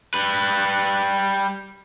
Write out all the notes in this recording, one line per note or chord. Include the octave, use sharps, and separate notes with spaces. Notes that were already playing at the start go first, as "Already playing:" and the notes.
G3 B4